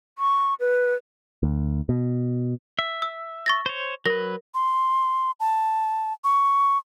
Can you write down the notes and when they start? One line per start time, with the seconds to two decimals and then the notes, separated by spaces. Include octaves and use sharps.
0.18 C#6
0.60 B4
1.43 D2
1.89 B2
2.79 E5
3.02 E6
3.46 C#6 A6 A#6
3.66 C5 C#5
4.06 F#3 A#4 B4 A#6
4.54 C6
5.40 A5
6.24 C#6